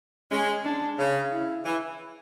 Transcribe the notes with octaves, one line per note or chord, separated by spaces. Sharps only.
G#3 C#4
D4
C#3
E4
E3